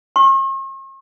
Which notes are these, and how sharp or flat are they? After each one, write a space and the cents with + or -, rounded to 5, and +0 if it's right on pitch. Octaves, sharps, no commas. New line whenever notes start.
C#6 -45